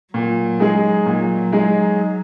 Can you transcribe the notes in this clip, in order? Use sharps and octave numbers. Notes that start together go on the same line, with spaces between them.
A#2 F#3
G#3 D#4 G#4
A#2
G#3 D#4 G#4